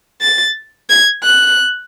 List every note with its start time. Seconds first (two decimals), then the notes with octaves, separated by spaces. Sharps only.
0.22 A6
0.90 G#6
1.24 F#6